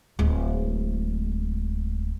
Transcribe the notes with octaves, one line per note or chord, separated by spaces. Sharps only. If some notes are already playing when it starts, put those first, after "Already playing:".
D1 G#3